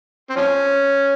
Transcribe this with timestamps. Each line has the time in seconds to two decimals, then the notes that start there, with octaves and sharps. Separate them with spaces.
0.30 C4
0.36 F3 C#4